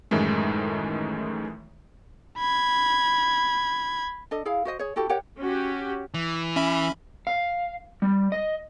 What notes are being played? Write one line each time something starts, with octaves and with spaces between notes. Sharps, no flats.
F#2 A2 D#3 E3 G#3 A3
B5 G#6
D4 A4 D#5
E4 G#4 F5
F#4 C5 D#5
G#4 C#5
E4 F#4 G4 A4
G4 A#4 C#5 F#5
C#4 F#4 G4
E3
C#4 E5 B5
F5
G3
D#5